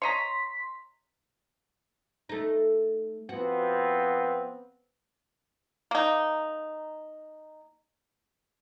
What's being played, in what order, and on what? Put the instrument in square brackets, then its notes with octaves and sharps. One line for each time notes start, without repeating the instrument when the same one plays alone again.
[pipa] C#5 D#5 A#5 [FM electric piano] C6 B6
[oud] A3 D#4
[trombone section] F3 B3 C4 [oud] F#4
[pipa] A#3 D#4